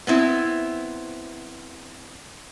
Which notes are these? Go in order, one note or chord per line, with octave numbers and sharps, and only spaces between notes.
B3 C4 E4